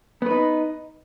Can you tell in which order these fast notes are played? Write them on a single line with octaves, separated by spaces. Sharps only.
B3 B4 D#4